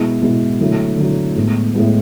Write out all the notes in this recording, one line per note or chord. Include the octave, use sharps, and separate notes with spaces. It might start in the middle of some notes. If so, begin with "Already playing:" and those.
Already playing: B2 G#3 B3 E4
B2 G#3 B3 E4
D3 F#3 A3 E4
D3 F#3 A3 E4
A2 G#3 B3
A2 G#3 B3